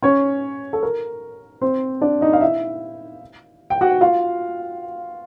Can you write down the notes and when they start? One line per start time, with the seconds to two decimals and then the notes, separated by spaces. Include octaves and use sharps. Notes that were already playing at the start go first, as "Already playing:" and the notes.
0.02 C#4 C#5
0.73 A4
0.83 A#4
1.61 C4 C5
2.01 D4 D5
2.21 D#4 D#5
2.33 F5
2.41 E4 E5
3.70 G5
3.81 F#4 F#5
4.01 F4 F5